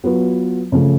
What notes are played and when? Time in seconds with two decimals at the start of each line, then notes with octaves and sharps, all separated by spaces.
0.04 F#3 B3 F4 B4
0.72 C#3 F3 A3